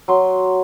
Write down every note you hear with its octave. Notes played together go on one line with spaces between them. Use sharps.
F#3 C6